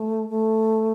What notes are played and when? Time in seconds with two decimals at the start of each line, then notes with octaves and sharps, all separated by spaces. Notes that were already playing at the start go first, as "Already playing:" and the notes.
Already playing: A3
0.29 A3